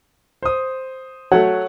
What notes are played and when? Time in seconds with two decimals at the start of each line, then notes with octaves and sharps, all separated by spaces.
0.43 C5 D#6
1.32 F#3 A3 C#5 F#5